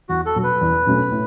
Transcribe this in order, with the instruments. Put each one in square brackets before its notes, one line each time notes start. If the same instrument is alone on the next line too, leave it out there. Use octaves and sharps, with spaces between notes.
[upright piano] E2 [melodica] F#4
[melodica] A4
[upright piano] B2 F#3
[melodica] B4
[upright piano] E2
B2 F#3 A3 C#4
A2